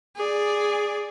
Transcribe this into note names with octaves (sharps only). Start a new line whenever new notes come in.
G#4 D5